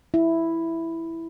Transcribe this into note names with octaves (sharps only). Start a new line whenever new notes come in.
E4